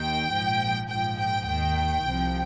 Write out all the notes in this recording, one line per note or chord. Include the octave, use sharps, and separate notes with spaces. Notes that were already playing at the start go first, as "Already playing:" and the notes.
Already playing: D#2 D#3 G5
A#1 G#2 F3
A#1 G#2 F3 G5
G5
D#2 D#3 G5
C2 C3 F3